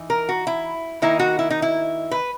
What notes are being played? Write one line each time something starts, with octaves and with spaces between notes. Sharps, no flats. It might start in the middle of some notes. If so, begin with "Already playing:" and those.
Already playing: E3 D#4
A#4
F#4
E4
D#3 A#3 D#4 E4
F#4
E4
D#4
E4
B4